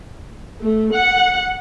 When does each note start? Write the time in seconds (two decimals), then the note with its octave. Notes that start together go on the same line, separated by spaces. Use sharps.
0.61 A3
0.92 F#5